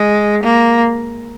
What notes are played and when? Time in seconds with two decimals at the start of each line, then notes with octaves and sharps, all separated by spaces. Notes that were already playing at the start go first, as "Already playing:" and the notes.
Already playing: G#3
0.43 A#3